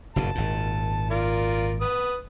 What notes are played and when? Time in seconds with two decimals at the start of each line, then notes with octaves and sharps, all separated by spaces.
0.16 F#1 G2 B2 A5
0.35 G#1 A#2
1.11 F4 A#4 D5
1.81 B4 D#6